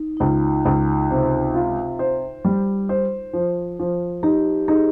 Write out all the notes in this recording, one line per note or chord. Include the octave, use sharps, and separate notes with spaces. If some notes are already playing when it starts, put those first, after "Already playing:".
Already playing: D#4
D#4
C#2 F4
C#2
C3
F4
C5
G3
C5
F3
F3
D#4 G4
D#4 G#4